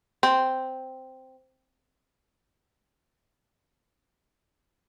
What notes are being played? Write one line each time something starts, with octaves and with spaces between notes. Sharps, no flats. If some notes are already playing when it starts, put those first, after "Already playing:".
C4